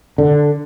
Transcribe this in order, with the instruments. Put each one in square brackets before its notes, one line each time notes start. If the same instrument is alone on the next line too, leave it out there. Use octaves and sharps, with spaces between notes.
[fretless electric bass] D3